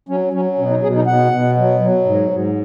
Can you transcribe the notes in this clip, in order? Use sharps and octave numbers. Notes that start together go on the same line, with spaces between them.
F#3 C#4
F#3 C#4
B2 C#4
D#4
B2 G#4
D#4
B2 F#5
B2
F#3
F#3
G#2
G#2